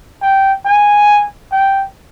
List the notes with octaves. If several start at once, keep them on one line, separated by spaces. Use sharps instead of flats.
G5
G#5
G5